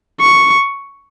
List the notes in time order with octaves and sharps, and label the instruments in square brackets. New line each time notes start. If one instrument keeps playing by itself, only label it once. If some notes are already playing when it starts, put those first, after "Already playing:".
[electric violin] C#6